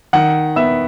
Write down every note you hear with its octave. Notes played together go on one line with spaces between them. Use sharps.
D#3 F#5
B3 E5